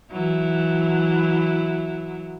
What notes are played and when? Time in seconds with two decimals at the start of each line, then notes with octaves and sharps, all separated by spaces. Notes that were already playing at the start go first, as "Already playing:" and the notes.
0.12 E3 F#3 E4